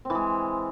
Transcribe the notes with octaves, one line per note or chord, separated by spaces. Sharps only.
E3 G#3 C4